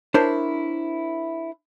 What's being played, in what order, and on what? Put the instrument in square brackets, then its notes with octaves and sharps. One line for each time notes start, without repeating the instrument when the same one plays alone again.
[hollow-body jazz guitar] D4 E4 A#4 C5 C#5